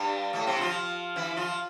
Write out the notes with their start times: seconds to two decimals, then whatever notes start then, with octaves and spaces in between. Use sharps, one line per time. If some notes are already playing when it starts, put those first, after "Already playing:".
Already playing: G2 G3
0.33 A2 A3
0.47 C3 C4
0.56 E4
0.61 F3 F4
1.16 E3 E4
1.37 F3 F4